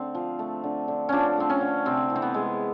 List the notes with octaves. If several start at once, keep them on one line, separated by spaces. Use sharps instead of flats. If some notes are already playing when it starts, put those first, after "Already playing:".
Already playing: D3 A3 C4
F3
A3
D3
D3
F3 C#4 D4
A3 C4
C#4
D3
C3 C4
E3
C4
B3
G#3